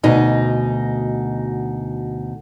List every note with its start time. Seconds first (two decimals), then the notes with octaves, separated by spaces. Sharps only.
0.03 D2 B2 D#4 G#5